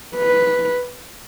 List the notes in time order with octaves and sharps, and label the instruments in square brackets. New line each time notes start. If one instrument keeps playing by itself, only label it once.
[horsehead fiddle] B4